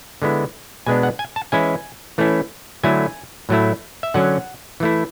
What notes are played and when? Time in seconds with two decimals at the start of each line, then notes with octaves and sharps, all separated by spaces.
0.22 D3 G#3 B3 E4
0.86 B2 G#3 B3 D4 G#5
1.03 F#5
1.19 G#5
1.36 A5
1.52 E3 G#3 C#4 E4 G#5
2.18 E3 A3 C#4 E4
2.83 D3 F#3 A3 E4 G#5
3.49 A2 F#3 A3 E4
4.03 E5
4.14 D3 F#3 C#4 F#5
4.80 E3 A3 E4